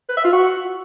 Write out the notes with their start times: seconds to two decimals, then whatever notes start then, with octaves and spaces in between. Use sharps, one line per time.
0.09 B4
0.17 E5
0.25 F4
0.33 F#4